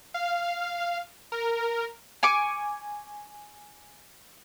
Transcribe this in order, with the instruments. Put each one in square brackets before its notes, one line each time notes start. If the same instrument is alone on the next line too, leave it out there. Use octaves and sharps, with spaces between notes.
[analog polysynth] F5
A#4
[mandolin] G#5 C#6 D6